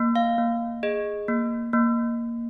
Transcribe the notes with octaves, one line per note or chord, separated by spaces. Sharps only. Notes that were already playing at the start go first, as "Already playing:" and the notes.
Already playing: A#3
F5
A#3
G#4 D#5
A#3
A#3